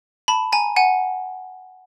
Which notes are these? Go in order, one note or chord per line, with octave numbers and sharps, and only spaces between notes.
A5 B5
G#5 A#5
F#5 G#5